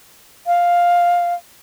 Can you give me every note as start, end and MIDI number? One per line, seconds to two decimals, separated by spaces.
0.47 1.34 77